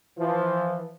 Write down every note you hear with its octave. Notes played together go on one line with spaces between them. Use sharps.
E3 F3